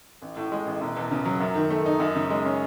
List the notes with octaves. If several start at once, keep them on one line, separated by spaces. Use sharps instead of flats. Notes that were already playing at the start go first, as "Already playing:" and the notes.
A1
A2
G#3
A1
E1
E2
C#3
F#3
F#2
D#3
A3
D#4
F#2
C#3
G#3
C#4